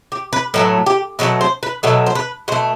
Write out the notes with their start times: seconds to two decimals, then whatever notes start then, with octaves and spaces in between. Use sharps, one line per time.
0.12 G4
0.33 B4
0.54 A2 F#3 A3 B4
0.86 G4
1.19 B2 F#3 A3 B4
1.41 C5
1.63 B4
1.83 B2 F#3 A3 A4
2.06 C5
2.15 B4
2.48 B2 C5
2.52 A3